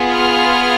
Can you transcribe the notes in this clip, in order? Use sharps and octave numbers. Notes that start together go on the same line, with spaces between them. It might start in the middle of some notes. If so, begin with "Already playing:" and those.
Already playing: B3 F4 G#4
F6